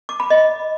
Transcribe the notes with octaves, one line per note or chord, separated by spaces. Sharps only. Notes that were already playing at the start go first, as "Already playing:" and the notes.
D6
B5
D#5